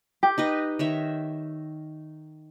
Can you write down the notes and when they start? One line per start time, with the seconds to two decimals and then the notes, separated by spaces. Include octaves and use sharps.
0.23 G4
0.38 D#4 B4 D#5
0.79 D#3 C#5 E5